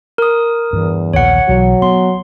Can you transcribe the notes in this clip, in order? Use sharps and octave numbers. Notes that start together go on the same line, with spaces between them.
A#4 D#6
E2 G2 E3
A#1 D#2 C#5 F#5
B1 E3 F#3
B3 C6